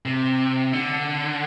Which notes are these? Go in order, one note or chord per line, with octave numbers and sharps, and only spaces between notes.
C3
D3